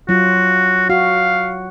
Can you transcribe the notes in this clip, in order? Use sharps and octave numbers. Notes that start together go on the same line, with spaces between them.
F#3 F4 F#4
F#4 F5